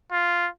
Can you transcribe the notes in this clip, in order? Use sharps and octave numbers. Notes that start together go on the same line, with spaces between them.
F4